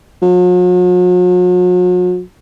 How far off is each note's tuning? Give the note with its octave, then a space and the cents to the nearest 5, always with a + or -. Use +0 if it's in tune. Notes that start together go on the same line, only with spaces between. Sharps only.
F#3 -45